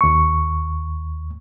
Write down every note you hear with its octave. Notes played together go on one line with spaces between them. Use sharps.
D#2 C#6